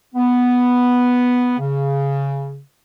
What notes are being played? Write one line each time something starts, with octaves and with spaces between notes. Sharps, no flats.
B3
C#3